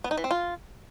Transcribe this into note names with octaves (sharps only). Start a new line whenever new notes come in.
B3
D#4
E3
C4
F4